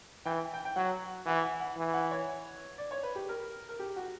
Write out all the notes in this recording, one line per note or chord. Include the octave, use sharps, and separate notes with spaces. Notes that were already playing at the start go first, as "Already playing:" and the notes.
E3 G5
G5
G5
F#3 F#5
E3 F#5
F#5
F#5
E3
F#5
C#5
D5
C#5
B4
G4
A#4
A#4
G4
F#4